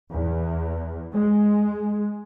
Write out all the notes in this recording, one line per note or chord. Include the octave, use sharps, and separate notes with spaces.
E2
G#3